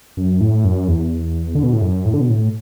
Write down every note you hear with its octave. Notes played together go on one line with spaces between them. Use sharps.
F#2
A2
F#2
E2
D3
B2
A2
F#2
A2
D3
B2
A2